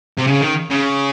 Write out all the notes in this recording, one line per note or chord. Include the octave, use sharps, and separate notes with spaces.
C3
C#3
D#3
C#3